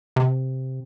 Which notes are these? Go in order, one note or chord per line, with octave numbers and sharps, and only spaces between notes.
C3